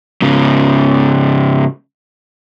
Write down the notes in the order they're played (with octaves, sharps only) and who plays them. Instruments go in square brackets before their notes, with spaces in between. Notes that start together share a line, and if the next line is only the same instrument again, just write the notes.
[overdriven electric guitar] G#2 C#3